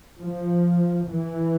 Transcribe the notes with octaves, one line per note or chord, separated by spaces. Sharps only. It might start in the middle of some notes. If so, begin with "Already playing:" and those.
F3
E3